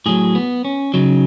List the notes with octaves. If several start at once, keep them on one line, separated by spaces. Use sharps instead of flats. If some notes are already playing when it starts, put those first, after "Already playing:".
A2 F#3 G#4
B3
C#4
C#3 F#3 D#4